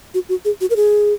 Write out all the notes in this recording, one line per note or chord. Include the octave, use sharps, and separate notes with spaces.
F#4
F#4
G#4
F#4
A#4
G#4